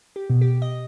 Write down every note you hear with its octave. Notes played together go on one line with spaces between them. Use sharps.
G4
B2
G4
D#5